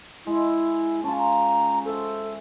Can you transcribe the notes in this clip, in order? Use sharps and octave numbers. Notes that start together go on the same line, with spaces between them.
G#3 E4
C#4 F4 A5
A#5
A4 C5 E5